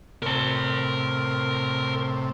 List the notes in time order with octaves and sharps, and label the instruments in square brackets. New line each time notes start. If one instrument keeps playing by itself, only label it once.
[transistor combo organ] A2 C3 [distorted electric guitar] A#4 A5